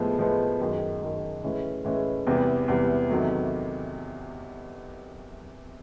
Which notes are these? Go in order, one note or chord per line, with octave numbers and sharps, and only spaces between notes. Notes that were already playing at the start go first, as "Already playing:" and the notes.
Already playing: A2 F3 G#3 B3
A2 F3 G#3 B3
F#2 D#3 G#3
F#2 D#3 G#3
A2 E3 G#3 C#4
A2 E3 G#3 C#4
E2 C3 E3 G3
E2 C3 E3 G3
E2 C3 D#3 F#3 A3